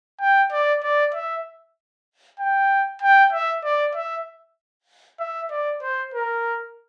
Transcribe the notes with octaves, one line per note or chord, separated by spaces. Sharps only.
G5
D5
D5
E5
G5
G5
E5
D5
E5
E5
D5
C5
A#4